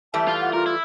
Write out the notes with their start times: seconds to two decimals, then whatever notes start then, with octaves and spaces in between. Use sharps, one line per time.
0.14 E3 G3 A3 A5
0.28 F4
0.41 F#5
0.53 F4 A#4
0.66 E4